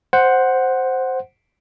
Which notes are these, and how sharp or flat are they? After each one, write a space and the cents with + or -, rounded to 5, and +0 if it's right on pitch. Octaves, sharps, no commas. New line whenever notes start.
C5 +0 F#5 +0